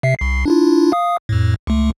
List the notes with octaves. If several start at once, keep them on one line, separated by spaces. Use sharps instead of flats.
C3 E5 C7
C2 C7
D4 E4 F4
F5 D#6
F2 A2
C#2 A3